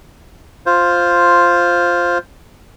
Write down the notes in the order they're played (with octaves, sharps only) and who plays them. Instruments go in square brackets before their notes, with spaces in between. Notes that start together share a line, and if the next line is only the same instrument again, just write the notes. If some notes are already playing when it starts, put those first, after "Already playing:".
[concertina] F4 C5